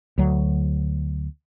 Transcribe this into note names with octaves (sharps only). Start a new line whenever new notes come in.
D2 F#3